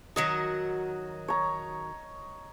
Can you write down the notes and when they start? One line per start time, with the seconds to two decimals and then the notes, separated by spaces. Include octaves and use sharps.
0.16 D#3 F#3 F#4 D#5
1.28 C#5 A#5